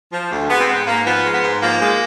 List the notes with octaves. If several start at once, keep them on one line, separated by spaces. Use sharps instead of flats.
F3
D2
G#3 B3
C4
G#2 B3
G#2 A#3
F3 B3
G#3
B3
G#2
F3 A#3
G#3